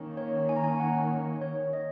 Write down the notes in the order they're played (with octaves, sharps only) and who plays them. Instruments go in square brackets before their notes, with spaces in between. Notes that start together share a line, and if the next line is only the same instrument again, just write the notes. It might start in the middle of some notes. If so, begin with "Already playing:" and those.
Already playing: [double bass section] D#3 A#3 C#4
[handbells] C#5
G#5
A#5
G#5
F#5
C#5
D#5